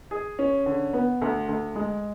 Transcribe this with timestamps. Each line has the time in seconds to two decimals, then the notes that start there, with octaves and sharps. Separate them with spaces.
0.11 G#4
0.39 C#4
0.66 D3
0.93 B3
1.22 D2
1.49 D2
1.76 G#3